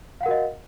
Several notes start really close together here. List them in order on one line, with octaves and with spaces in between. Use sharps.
F5 F#5 A#4 F#4 D#5